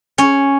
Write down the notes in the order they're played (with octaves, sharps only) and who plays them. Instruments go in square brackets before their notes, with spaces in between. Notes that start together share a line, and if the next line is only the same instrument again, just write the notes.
[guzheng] C#4